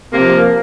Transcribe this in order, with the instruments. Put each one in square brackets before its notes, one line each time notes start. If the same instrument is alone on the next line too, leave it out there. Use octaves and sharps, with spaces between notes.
[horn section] C3 F3 A#3